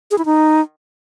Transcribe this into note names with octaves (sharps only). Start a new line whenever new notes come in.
G#4
E4
D#4